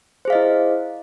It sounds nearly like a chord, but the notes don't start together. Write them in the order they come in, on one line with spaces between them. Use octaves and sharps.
C5 G#4 F5 D#5 E4